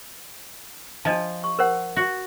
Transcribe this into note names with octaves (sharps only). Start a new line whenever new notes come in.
F3 D4 D#5 A5
C#6
A#4 C5 F#5
F#4